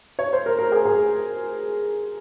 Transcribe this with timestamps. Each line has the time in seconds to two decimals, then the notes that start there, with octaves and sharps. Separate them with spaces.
0.19 C#5
0.33 C5
0.46 A#4
0.59 A#4
0.72 G#4
0.85 G#4